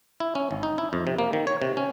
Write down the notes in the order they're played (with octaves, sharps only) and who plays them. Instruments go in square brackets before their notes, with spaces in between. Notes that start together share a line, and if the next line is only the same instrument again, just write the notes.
[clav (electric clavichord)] E4
C#4
G#1
D#4
E4
F2
C3
A#3
D#3
C#5
C3
C#4